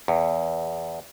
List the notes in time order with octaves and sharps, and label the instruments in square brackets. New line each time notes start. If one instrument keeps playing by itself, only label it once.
[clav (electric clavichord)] E2